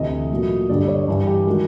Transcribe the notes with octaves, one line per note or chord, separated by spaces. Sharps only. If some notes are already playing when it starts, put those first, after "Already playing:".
Already playing: D2 C3 E3 D#5
A#2 F#3 A3
G2 D3 G3 D5
C#5
G2 E3 G3
G4
D#3 G#3 F#4